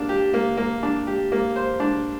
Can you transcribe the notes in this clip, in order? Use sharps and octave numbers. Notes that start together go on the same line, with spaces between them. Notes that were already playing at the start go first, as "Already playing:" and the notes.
Already playing: A#3 D4
G4
A#3
A#3
D4
G4
A#3
C5
D4